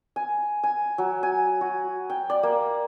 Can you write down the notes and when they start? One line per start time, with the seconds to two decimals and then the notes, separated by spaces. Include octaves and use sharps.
0.16 G#5
0.63 G#5
0.98 F#3
1.23 G#5
1.61 F#4
2.10 G5
2.30 D5
2.43 A#3